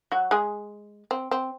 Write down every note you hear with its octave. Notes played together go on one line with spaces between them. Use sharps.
F#3 F#4
G#3 G#4
C4
C4